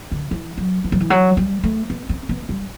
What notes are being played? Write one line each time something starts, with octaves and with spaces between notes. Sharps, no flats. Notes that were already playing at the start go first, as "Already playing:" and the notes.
D3
E3
F#3
E3
F#3
E3
F#3
G3
A3
B3
C4
B3
G3